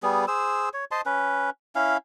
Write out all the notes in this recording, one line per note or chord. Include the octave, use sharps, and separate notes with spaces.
G3 B3 G#4
G#4 C5 E6
C#5
C5 D#5 A5 C6
C#4 B4
C#4 E4 F5